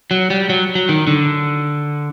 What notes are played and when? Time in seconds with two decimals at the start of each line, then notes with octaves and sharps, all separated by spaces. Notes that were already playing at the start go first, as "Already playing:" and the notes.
0.11 F#3
0.30 G3
0.50 F#3
0.75 F#3
0.89 D#3
1.07 D3